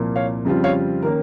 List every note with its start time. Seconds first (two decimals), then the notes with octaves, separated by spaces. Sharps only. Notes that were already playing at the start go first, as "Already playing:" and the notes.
Already playing: C2 A#2 F3 A#3
0.16 C#5 F5
0.45 F2 C#3 G3 C4 F4
0.64 C#5 F5
1.02 D#3 A#3 C#4 A#4